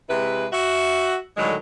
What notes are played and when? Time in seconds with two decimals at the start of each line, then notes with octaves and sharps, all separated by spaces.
0.09 C3 G#3 E4 B4
0.53 F#4 E5
1.37 A2 D3 D#3 F#3 G#3